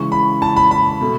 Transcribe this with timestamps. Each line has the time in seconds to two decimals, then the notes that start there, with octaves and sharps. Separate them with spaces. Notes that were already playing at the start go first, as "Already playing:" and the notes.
Already playing: C#3 E3 G#3 C#6
0.12 B5
0.42 A5
0.57 B5
0.71 B5
1.01 B2 A3